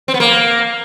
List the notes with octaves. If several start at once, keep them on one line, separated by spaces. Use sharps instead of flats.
C4
B3
A#3